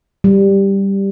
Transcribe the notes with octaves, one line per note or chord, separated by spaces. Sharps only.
G3